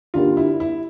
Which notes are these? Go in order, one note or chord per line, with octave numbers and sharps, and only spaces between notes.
G2 D3 G3 A#3 F4
E4
E4